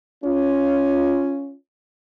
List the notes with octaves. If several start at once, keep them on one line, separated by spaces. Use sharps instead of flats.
C#4 F4